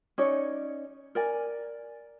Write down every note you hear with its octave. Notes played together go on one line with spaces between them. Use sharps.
C#4 D#4 C#5 D5
A#4 D5 G#5